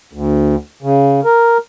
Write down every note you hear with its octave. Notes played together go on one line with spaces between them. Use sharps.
D2
C#3
A#4